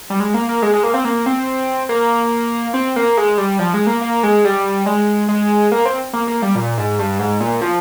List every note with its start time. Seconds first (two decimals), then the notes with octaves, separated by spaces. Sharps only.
0.10 G3
0.20 G#3
0.34 A#3
0.49 A#3
0.62 G#3
0.73 G#3
0.83 A#3
0.94 C4
1.05 A#3
1.26 C4
1.89 A#3
2.74 C4
2.96 A#3
3.17 G#3
3.38 G3
3.59 F3
3.74 G#3
3.87 A#3
4.01 A#3
4.23 G#3
4.44 G3
4.86 G#3
5.29 G#3
5.72 A#3
5.85 C4
6.13 A#3
6.28 A#3
6.42 G3
6.55 A#2
6.78 G#2
6.99 G2
7.19 G#2
7.40 A#2
7.61 F3